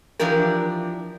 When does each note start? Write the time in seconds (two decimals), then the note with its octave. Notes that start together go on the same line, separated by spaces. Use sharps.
0.19 E3 F3 D4 G4 A#4